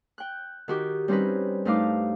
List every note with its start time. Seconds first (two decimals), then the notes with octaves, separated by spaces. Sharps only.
0.18 G5 F#6
0.68 D#3 F#4 G4
1.08 G3 C4 C#4 D#4 B4
1.65 G2 A3 D#4 F5 D6